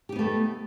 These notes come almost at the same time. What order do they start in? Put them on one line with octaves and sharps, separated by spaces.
G4 D#4 B3 A3